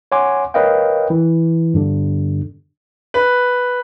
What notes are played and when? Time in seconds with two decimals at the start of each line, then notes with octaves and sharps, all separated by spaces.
0.12 C#5 F#5 G#5 C6 D6
0.54 A#4 B4 C#5 D#5 F5 G5
1.10 E3
1.74 G2 D3
3.14 B4